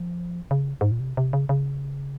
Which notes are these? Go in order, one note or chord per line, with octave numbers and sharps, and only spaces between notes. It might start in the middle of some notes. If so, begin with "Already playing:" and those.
Already playing: F3
C#3
G#2
A#2
C3
C3
C#3
C#3